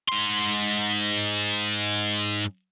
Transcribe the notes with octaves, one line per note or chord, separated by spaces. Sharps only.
G#2 C6